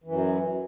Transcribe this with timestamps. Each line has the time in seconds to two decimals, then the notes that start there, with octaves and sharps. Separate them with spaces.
0.04 E3
0.07 F#2
0.11 F#3